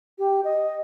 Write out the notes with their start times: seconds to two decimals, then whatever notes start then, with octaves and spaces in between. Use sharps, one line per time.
0.19 G4
0.45 D#5